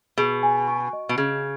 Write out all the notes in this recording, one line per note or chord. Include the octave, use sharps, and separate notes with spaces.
B2 G#4
G#5
C#6
D#5
B2
C#3 G#4